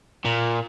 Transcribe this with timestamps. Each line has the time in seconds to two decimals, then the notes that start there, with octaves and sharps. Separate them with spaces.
0.25 A#2